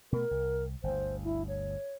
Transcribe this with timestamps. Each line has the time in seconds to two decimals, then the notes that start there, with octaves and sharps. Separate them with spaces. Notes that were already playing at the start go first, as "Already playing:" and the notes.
0.12 B2 A3 A#4
0.31 C2
0.83 G1 D2 C5
1.24 E4
1.48 C#5